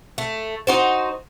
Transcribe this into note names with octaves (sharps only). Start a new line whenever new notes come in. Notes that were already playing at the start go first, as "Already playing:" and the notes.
A3
D#4 F#4 C5